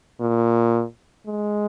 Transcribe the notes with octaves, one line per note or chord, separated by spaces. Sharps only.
A#2
G#3